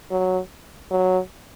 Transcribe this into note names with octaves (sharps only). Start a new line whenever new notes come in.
F#3
F#3